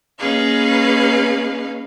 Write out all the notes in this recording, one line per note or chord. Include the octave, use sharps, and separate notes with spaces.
A#3 C#4 D#4 G#4 B4 F5